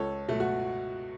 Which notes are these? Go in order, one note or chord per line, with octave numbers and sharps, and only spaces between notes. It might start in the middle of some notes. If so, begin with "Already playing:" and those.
Already playing: C#2 A4 C#5
B2 F#3 A3
F#4